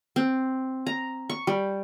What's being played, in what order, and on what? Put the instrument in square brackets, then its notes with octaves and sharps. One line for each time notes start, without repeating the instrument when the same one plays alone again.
[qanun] C4
A#5
C#6
G3